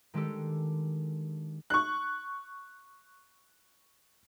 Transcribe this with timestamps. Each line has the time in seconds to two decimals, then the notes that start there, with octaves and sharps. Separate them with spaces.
0.14 D#3 G#3 D4 G4 A4
1.70 C#6 F#6